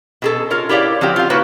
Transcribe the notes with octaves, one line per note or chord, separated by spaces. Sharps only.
B2 G#4 A4
F4 A#4 C#5
E4 G4 C#5 D5 F5
F3 C4 F#4 G4
F4 F5
A#3 E4 F#4 B4 C#5